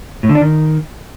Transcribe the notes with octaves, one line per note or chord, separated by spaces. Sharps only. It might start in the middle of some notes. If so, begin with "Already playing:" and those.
A2
D3
D4
D#3